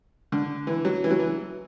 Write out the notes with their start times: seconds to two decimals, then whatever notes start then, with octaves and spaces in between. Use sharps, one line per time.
0.32 D3
0.67 E3
0.85 F#3
1.04 E3
1.11 F#3
1.19 E3